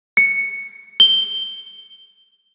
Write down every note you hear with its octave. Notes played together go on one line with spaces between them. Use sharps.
C#7
G7